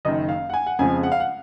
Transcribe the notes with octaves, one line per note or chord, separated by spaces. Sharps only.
F#1 F#2 D#3 D#5
F5
F#5
G#5
F#5
F2 C#3 F3 G#3 G#5
F#5
F5
F#5